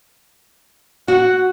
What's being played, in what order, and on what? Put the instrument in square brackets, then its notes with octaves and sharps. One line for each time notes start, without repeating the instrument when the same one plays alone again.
[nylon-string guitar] F#4 [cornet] F#5